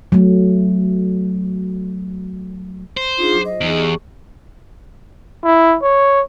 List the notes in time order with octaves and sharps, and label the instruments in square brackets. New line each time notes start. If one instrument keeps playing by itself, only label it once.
[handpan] F#3 A3
[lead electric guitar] C5
[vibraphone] D4 D#4 G#4 [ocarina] F4
[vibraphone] F#3 D6
[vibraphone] F4 C5 [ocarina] D#5
[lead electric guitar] E2 [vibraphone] D#4 G#4
[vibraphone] G4 G#4 C#6
[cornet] E4
C#5